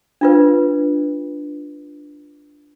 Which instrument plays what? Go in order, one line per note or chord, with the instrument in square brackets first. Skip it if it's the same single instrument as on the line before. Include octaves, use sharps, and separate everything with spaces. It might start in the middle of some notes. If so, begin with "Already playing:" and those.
[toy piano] D4 F4 B4